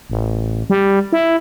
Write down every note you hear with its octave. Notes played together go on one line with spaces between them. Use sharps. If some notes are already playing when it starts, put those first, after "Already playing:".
A1
G3
E4